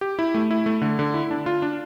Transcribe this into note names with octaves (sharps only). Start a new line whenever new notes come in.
G4
E4
A3
E4
A3
D3
D3
E4
D4
F4
D4